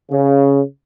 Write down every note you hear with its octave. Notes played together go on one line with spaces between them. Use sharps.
C#3